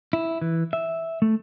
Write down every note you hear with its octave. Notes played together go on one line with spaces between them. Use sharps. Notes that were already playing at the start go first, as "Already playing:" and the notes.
E4
E3
E5
A3